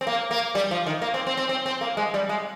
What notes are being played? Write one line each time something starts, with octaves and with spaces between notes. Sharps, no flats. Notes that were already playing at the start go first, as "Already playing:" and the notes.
C4
A#3
A#3
G3
F3
D#3
A#3
C4
C4
C4
C4
C4
A#3
G#3
G3
G#3